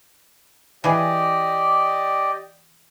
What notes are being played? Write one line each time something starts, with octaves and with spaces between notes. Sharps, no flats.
E3 G4 G#4 D5 D#5